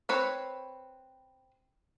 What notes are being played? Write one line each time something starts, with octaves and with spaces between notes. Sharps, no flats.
C4 B4 C#5